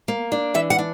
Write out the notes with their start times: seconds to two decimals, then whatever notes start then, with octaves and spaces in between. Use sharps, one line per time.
0.08 A#3
0.32 D4
0.54 E3 E5
0.70 F#5
0.79 D4